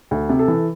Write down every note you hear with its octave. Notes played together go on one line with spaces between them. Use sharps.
D2
C3
A4
E3